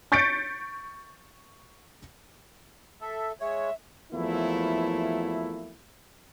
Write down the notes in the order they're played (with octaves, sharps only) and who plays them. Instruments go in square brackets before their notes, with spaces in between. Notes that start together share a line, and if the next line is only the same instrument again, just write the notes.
[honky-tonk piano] C#6 G6 A6 B6 C#7 D7
[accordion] A4 E5
[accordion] G#3 C#5 [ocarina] E5
[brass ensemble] E2 F3 F#3 A3 A#3 E4